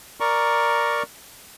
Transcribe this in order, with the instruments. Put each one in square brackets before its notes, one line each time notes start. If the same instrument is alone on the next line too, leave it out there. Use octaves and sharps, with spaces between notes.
[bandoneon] A#4 D5 A#5 C#6